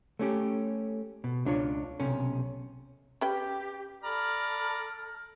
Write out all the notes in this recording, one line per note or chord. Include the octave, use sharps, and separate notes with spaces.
A3 C#4 G4
B2
C#2 D4 F4 C#5
B1 C3 C#4
C#4 G4 B4 G5
A4 D5 A#5 B5 F6